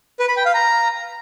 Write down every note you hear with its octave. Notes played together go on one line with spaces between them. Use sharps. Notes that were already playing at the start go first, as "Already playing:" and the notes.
B4
B5
G5
F5
A#5